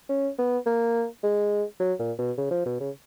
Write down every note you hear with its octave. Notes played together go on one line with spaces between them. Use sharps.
C#4
B3
A#3
G#3
F#3
A#2
B2
C#3
F3
B2
C#3